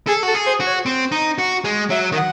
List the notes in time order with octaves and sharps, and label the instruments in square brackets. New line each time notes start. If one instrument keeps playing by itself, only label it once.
[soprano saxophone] G#4 [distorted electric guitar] A4
[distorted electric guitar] F#4 [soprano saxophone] A4
[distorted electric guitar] G#4
[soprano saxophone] C5
[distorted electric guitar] F#4
[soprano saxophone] C#5
[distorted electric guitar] C4
D#4
F#4
G#3
[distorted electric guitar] F#3 [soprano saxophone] E5
[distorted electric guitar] D#3
[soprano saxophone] F#5